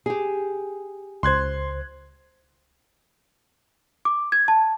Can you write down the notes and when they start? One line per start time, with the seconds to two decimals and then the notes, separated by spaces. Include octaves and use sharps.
0.06 G4 G#4
1.23 C#2 C5 C6 F#6 G#6
4.05 D6
4.32 G#6
4.48 A5